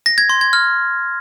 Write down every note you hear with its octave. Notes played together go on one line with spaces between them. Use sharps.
A#6
G#6
C6
G#6
F6